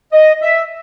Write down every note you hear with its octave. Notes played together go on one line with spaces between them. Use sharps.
D#5
E5